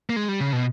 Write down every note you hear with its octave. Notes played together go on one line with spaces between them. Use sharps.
A#3
G#3
G3
C#3
B2